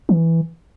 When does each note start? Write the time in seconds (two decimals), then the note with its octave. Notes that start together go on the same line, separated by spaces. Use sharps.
0.09 E3